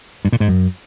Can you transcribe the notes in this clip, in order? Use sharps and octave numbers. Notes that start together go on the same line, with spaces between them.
G2
A#2
G#2
F#2